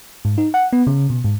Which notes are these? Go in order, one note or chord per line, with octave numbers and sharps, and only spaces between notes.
G#2
D#4
F#5
B3
C#3
B2
G#2